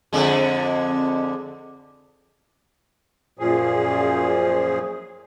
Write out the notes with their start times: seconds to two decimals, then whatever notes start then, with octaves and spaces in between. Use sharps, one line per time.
0.13 F2 D3 G#3
3.39 F#2 A#2 F3 G#4